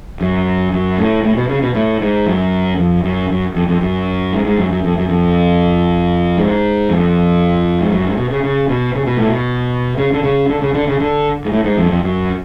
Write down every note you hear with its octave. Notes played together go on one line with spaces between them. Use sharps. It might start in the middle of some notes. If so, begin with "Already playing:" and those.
F#2
F#2
A2
A2
B2
C#3
B2
A2
G#2
F#2
F2
F#2
F#2
F2
F2
F#2
G#2
G#2
F#2
F#2
F2
F#2
F2
G#2
F2
G#2
F#2
G#2
B2
C#3
C#3
B2
C#3
B2
A2
B2
C#3
D3
C#3
D3
C#3
D3
C#3
D3
G#2
A2
G#2
F2
F2
F#2